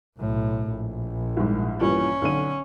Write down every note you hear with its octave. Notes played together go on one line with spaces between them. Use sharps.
B1 A2
A#1
C2 G#2
G2 A#2 E3 C#4
B1 D3 D#7